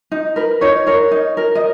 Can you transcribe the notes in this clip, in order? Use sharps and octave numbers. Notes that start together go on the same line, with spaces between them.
D#4
A#4 B4
D#4 C#5
A#4 C#5
D#4
A#4
D#5